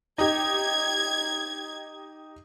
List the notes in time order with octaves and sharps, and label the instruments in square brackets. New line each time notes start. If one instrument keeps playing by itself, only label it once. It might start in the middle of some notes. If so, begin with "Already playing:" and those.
[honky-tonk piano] D#4 G4 [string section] G#6